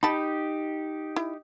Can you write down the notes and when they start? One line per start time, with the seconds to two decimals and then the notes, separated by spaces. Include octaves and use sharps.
0.03 D#4 G4 A5 B5
1.16 E4